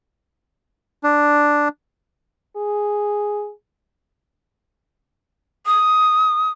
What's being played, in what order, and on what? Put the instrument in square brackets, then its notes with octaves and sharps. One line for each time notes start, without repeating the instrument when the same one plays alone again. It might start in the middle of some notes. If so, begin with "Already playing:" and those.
[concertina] D4
[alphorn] G#4
[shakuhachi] D#6